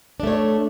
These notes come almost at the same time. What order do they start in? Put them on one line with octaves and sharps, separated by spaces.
D4 A3 C#5